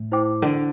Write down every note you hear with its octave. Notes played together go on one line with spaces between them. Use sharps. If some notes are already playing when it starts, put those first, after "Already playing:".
Already playing: A2
E4 C5 G5 D6
D3